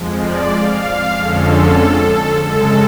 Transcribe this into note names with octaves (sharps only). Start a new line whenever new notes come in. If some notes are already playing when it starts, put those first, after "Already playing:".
Already playing: F2 F3 G#3
D5
F5
F2 D3 F3 G#3 C#4 A4
F#2 C#3 G#3 A4